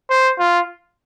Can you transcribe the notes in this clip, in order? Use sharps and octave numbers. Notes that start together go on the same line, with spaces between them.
C5
F4